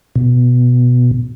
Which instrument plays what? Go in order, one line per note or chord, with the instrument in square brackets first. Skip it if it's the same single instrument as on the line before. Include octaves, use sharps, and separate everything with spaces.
[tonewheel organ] B2